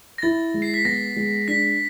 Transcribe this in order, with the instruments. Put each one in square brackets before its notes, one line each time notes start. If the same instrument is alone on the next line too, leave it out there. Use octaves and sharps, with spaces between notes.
[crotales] A#6
[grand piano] E4 [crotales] A6
[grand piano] G#3
[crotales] C7
B6
[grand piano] B3 [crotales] A#6
[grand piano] G#3
[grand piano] D4 [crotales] B6